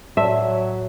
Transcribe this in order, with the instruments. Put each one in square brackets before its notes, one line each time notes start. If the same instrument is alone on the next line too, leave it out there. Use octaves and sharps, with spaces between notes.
[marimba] A2 D5 A5 [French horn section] F#3 [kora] E5